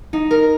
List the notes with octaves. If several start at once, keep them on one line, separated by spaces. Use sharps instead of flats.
D#4
A#4